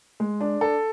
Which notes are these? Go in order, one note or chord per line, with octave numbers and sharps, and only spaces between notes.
G#3
D4
A4